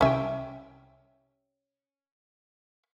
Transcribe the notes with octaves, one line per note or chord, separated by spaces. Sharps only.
C2 C3 C#4 E5 G5